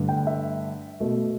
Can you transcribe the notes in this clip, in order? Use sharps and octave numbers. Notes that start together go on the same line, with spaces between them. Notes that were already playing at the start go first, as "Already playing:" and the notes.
Already playing: G2 D3 A3
G5
E5
B2 A3